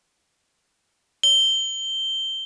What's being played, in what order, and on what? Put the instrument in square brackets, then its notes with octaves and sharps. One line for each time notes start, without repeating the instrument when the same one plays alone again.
[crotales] G7